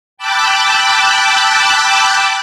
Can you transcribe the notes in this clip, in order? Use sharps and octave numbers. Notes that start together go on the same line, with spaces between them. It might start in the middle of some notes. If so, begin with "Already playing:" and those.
G5 A5 B5 D6 E6 F#6